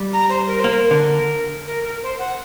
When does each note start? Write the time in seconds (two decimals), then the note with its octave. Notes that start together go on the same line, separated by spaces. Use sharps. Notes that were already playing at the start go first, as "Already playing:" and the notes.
Already playing: G3
0.13 A#5
0.29 C5
0.47 A#4
0.60 A#3 C5
0.74 A#4
0.91 D3
1.67 A#4
1.84 A#4
2.03 C5
2.19 F#5